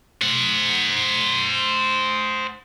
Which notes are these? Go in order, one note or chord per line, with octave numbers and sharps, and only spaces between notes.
C5 F#5